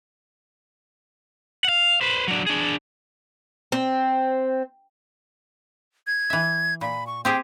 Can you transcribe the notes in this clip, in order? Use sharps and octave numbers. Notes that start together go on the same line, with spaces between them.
F5 F#5
B4 C5
F#3 D4
D4 G#4
C4
G#6
E3 E5
A#2 B5
C#6
C4 G4 G#4 G5